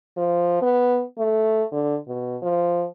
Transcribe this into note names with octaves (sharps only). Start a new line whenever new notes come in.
F3
B3
A3
D3
B2
F3